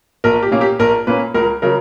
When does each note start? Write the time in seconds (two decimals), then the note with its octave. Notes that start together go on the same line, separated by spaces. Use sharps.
0.24 A#1 A#4
0.43 G4
0.52 A#2 A#3 C#4
0.61 G4
0.79 A#1 A#4
1.07 A#2 A#3 C#4 B4
1.34 C#2 A#4
1.62 C#3 F#3 A#4